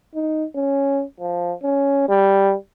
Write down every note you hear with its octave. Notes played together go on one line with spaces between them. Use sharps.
D#4
C#4
F3
C#4
G3